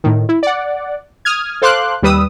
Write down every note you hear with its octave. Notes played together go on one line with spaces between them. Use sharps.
A2 D#3
E4
D5 F#5
D#6 F6 G#6
A4 C5 F5 C6 D6 F#6
D#2 G3 B4 D#6 E6